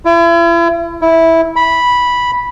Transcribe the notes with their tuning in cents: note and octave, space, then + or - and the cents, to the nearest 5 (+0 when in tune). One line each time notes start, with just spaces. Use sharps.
E4 +40
E4 -10
B5 -10